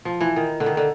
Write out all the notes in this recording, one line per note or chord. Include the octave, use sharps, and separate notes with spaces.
F3
E3
D#3
D3
D#3
D3